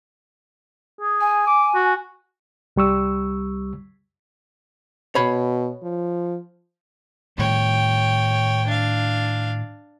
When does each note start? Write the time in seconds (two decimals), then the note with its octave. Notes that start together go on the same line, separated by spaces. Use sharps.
1.01 G#4
1.21 G#5
1.47 D6
1.75 F#4
2.76 C2 G3 C#6 E6
5.15 B2 C#5 B5
5.83 F3
7.38 A2 D#3 G3 C#5 G5
8.67 D4 F5